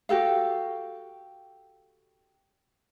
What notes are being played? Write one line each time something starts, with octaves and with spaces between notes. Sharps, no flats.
F#4 G4 A4 F5